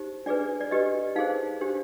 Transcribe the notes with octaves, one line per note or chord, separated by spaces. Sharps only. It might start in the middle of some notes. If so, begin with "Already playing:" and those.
Already playing: D#4 G4 C5
D4 G#4 B4 D5
D5
D4 G4 B4 D#5
D#4 G#4 C5 F5
D4 G4 C5